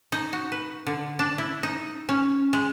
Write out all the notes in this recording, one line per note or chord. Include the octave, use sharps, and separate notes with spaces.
D#4
F#4
B4
D3
D4
E4
D#4
C#4
G#3